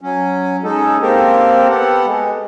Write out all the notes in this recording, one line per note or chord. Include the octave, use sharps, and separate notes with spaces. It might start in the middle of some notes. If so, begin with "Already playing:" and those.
F#3 C#4
G#3 C#4 D#4 A4
A#3 C4 G4 A4 A#4
B3 G4 A4 F#5
G#3